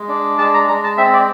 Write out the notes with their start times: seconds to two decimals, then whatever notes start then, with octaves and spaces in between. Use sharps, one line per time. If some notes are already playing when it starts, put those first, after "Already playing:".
Already playing: G#3
0.08 D4
0.38 G#3 A5
0.54 A#5
0.68 G#3 A#5
0.84 A5
0.97 C4 E5
1.13 D5